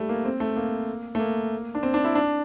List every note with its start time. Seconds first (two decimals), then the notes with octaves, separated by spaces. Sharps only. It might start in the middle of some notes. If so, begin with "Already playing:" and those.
Already playing: G3 A3
0.09 A#3
0.25 C4
0.40 A3
0.57 A#3
1.15 A3
1.19 A#3
1.75 D4
1.83 C4
1.94 D4
2.04 E4
2.15 D4